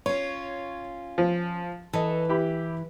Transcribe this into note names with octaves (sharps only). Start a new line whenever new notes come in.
C#4 F4 C#5
F3
E3 A4 D#5
E4 G4 B5